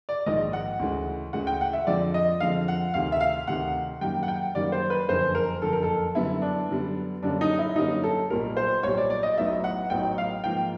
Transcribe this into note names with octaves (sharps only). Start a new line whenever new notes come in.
D5
A#1 G#2 D#3 G#3 D#5
F#5
D2 C#3 E3 G#3
D2 C#3 E3 G#3 F#5
G5
F#5
E5
F2 D3 F3 G#3 C4 D5
D#5
F2 D3 F3 G#3 C4 F5
F#5
D2 C3 D#3 F5
E5
F5
D2 C3 D#3 F#5
F#2 D#3 G3 A#3 G5
F#5
G5
F#2 D#3 G3 A#3 D5
C5
B4
F#1 F2 D3 C5
A#4
F#1 F2 D3 A4
A#4
A4
F#2 D3 G3 B3 E4
D4
F#2 D3 G3 B3
F#2 D3 G3 A#3 C#4 D4
D#4
E4
F#2 D3 G3 A#3 C#4 D#4
A4
B1 A#2 G3 A#4
C5
B1 A#2 G3 C#5
D5
D5
D#5
A1 A2 F#3 B3 D#4 E5
F#5
A1 A2 F#3 B3 D#4 G5
F5
G#2 F3 A#3 G5